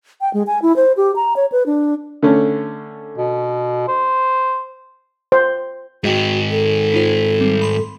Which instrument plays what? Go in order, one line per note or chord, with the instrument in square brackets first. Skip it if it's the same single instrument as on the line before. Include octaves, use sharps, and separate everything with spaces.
[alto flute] G5
G#3
G#5
E4
C5
G4
A#5
C#5
B4
D4
[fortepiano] D3 A3 C#4
[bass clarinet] B2
C5
[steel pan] C5
[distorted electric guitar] G#2 D#3 [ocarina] F#4 [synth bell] G#4 D#5 G5
[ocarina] A4
[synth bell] D#4 F4 C5
G3 C4
B5 C6